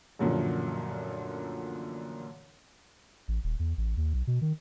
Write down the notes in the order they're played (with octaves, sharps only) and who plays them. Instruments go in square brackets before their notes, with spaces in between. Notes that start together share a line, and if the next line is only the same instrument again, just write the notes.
[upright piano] A1 F#2 A#2 D3 F3
[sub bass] A1
D#1
E2
A1
D#2
B1
B2
D#3